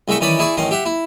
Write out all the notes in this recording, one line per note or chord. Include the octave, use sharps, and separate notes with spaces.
C2 G#3 A3 E5 C#6
D#3 E3 C#4 D5 B5 D#6
E4 G#4 D5 C#6
A1 D#3 C#4 C6
G4 E5 F#5
E4